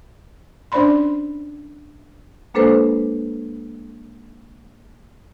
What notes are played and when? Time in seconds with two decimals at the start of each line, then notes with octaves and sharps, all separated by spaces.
0.72 C#4 D4 C5 D5 B5 C6
2.54 G#3 A#3 D4 A4 B4 C5